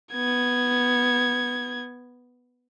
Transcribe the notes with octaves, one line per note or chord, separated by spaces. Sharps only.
B3 G#6